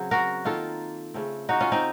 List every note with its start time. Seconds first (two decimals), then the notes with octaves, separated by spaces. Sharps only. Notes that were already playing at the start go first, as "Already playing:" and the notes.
Already playing: C#3 F#3 C4
0.11 F#4 A#4
0.45 D#3 A#3 F4 A4
1.14 C#3 A3 C4
1.49 D#4 F#4
1.60 C#4 F4
1.72 C4 D#4